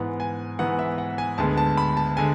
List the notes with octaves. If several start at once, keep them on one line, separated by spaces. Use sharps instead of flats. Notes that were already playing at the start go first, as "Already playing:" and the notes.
Already playing: G#2 E3 B3 F#5
G#5
G#2 E3 B3 F#5
E5
F#5
G#5
D2 D3 G#3 B3 A5
A5
B5
A5
D3 G#3 G#5